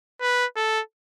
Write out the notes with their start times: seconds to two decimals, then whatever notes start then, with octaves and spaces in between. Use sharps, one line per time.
0.21 B4
0.57 A4